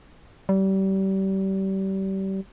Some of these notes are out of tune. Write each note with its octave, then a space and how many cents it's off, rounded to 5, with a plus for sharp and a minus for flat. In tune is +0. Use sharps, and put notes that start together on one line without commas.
G3 -30